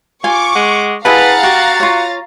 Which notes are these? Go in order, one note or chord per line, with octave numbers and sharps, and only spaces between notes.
F4 G#5 C#6 D6
G#3 F#5
E4 G#4 B4 F5 F#5 A5 A#5 A6
F#4 G4
F4 C#5